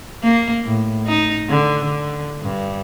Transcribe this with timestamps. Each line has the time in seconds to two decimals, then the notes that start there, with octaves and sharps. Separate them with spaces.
0.23 A#3
0.64 A2
1.07 D#4
1.49 D3
1.84 D3
2.42 G2